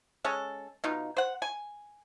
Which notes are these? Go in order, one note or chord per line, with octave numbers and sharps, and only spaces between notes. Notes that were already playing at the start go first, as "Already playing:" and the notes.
G#3 C#4 A4
B2 D#4 F4
C5 F#5
G#5